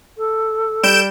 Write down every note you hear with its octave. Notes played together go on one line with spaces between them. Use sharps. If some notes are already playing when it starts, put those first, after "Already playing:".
A4
G3 G6 D7 E7